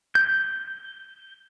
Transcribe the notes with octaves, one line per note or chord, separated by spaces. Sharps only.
G6